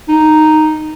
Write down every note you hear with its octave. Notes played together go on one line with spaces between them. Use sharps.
D#4